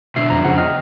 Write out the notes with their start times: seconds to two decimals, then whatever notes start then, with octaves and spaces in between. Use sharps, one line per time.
0.16 G#2 B2 D3 E5 C7
0.30 F2 F3 A#5
0.45 C#3 F3 F#5
0.58 D#5 G5 F6